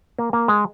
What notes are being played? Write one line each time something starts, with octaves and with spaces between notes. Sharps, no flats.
A#3
A#3
G#3